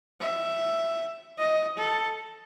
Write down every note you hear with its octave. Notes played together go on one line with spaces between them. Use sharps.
E5
D#5
A4